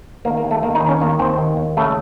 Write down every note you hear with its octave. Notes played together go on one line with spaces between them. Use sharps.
D#3 A#3
A#3
D#2
A3
D#3 A#3
D#4
D#2
C#4
D#3 A#3
D#2 C4
D#3
D#2
C#3 A3